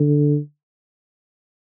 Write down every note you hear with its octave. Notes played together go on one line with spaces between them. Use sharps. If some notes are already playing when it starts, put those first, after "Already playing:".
Already playing: D3